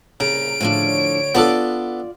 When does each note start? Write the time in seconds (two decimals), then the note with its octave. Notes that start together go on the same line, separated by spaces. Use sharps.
0.20 C2 A#2 C#3 A#5 D7
0.61 D2 A2 D3 F3 D4 C#5
1.35 B3 D4 F4 A4 D5